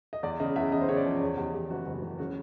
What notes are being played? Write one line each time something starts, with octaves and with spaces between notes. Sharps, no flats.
D#5
E2 D5
C#3 D#5
E2 E5
C#3 D#5
C5
C#3 C#5
D5
F3
E2 C#5
E2 G4
E2 G4
F#1 F#4
F#1
F#4
E3
C#3 F#4